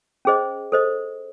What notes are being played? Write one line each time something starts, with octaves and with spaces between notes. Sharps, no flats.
C#4 G#4 C5 D#5
A4 C5 D#5